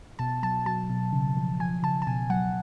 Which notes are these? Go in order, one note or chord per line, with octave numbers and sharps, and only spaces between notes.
B2 A5
F#3 A5
F#3 A5
B2
C#3
F3
F3 G#5
C#3 A5
A5
B2 G#5
F#3 F#5